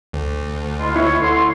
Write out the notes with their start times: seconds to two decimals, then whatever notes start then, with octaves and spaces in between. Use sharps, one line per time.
0.13 D2
0.79 G#3 E4 F4
0.96 E4 C#5
1.21 D3 C6